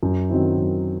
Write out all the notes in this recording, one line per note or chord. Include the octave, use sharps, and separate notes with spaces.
F#2
D#3 F#3 C4 E4
F#2